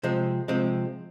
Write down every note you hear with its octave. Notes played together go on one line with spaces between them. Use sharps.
C3 F3 G#3 C4
C3 F3 G#3 C4